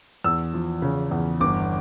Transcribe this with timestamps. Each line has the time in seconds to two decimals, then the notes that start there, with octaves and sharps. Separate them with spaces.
0.24 E2 E6
0.54 F3
0.82 C#3
1.11 E2
1.40 G1 D6